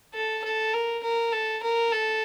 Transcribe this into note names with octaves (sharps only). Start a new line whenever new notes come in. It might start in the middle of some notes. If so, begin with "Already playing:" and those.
A4
A4
A#4
A#4
A4
A#4
A4